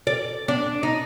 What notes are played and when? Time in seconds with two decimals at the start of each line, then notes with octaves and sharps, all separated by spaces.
0.07 D5
0.48 D4
0.83 D#4